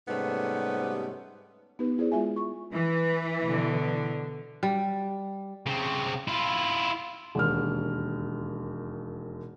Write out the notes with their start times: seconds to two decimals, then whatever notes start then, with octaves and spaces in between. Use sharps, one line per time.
0.08 G#2 C3 G3 A3 B3 C#4
1.79 B3 D#4 G4 B4
1.98 E4 G#4 C5 D5
2.12 G#3 F4 E5 G#5
2.36 C#6
2.72 E3
3.43 B2 D3
4.63 G3
5.66 C#3 C4
6.28 E4 F4
7.35 E1 D#2 F6